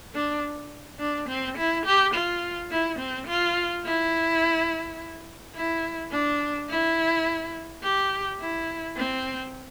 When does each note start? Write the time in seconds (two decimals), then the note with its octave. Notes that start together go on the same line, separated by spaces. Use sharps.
0.15 D4
0.99 D4
1.28 C4
1.57 E4
1.85 G4
2.14 F4
2.71 E4
2.99 C4
3.27 F4
3.85 E4
5.56 E4
6.12 D4
6.70 E4
7.83 G4
8.40 E4
8.97 C4